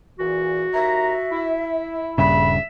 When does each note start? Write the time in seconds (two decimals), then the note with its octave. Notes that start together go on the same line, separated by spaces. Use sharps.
0.19 E2 A#2 E3 F#4
0.73 D#2 E5 A#5
1.30 E4
2.18 D#1 G2 C#3 E5 B5